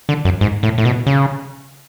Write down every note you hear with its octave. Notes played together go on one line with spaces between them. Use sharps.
D3
F#2
G#2
A2
A2
B2
C#3